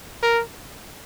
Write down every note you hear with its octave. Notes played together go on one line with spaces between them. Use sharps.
A#4